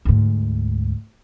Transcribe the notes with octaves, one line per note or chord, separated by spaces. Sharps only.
D2 G#2